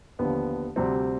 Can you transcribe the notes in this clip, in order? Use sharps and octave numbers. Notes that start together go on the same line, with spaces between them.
D#2 D3 F3 B3
D2 C3 G3 C4